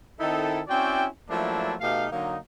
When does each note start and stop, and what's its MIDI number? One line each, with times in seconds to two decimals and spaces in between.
0.20 0.60 51
0.20 0.60 60
0.20 0.60 63
0.20 0.60 64
0.20 0.60 69
0.68 1.06 60
0.68 1.06 61
0.68 1.06 64
0.68 1.06 66
0.68 1.06 74
0.68 1.06 79
1.28 1.75 53
1.28 1.75 54
1.28 1.75 57
1.28 1.75 58
1.28 1.75 62
1.28 1.75 64
1.81 2.06 47
1.81 2.06 57
1.81 2.06 63
1.81 2.06 67
1.81 2.06 77
2.11 2.37 50
2.11 2.37 54
2.11 2.37 58
2.11 2.37 63